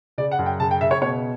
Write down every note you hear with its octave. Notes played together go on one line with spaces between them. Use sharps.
C#3 D5
F#5
F#2
G5
C#3 A5
G5
C#3 E5
C#5
B2 C#5